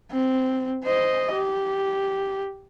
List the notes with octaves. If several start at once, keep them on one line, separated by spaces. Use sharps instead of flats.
C4
C5 D#5
G4